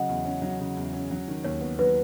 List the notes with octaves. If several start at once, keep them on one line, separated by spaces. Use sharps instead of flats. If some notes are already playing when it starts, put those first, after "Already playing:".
Already playing: C#3 F#3 D#5 F#5
E2
C#4
F#3
C#3
E2
C#4
F#3
D#3
D#2 C#5
B3
F#3 B4